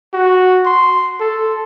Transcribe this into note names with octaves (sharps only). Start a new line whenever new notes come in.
F#4
C6
A4